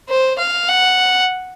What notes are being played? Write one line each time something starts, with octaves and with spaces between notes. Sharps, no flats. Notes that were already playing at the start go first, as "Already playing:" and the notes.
C5
F5
F#5